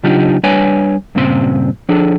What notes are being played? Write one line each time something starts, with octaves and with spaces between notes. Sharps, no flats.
C#3 F#3 D4 D#4 F4 G4
G3 D4 B4 C#5 G#5
G2 A#2 C#3 C4 C6
F3 D4 G#4 A4